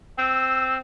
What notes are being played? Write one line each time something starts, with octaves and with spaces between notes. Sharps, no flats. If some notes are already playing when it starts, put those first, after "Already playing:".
C4 E6